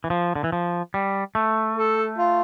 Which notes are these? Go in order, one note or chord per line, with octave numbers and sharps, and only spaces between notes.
E3
F3
D3
E3
F3
G3
A3
A4
F4